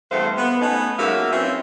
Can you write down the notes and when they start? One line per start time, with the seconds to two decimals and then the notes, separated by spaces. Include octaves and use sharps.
0.11 E2 G2 A3 B3 C5 F5
0.38 B3
0.61 A3 B3 C#4 D#4
0.98 G#2 F#3 A#3 B3 E5 F5
1.31 C4 C#4 E4 F4 B4 E5